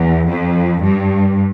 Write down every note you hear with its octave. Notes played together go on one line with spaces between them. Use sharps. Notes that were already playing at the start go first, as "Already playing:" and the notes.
Already playing: E2
F2
G2